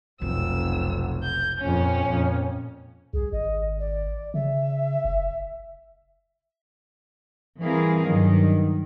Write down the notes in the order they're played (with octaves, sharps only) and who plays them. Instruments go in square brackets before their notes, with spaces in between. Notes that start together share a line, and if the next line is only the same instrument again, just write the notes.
[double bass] F1 B1 [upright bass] C3 [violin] E6
[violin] G6
[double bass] F2 A#2 [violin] C#4
[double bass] F2 A#2
[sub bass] C2 [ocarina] G#4
[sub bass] G#1 [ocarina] D#5
[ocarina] D5
[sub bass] C#3 [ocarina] E5
[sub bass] F#1
[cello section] E3 G3 C4 G#4 A#4 F5
G2 D#3 F#3